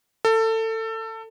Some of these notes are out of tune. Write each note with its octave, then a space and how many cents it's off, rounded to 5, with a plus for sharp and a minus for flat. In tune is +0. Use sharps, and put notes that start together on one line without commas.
A4 +25